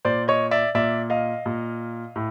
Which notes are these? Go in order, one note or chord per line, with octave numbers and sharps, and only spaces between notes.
A#2 C5 D5
C#5 D#5
D5 E5
A#2 D5 E5
D#5 F5
A#2
A2